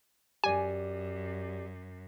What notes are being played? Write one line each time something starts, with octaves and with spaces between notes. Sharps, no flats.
F#2 G4 D5 G#5